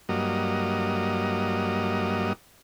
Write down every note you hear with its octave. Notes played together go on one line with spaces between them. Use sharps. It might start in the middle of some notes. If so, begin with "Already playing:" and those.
G2 F#3 A#3 D#5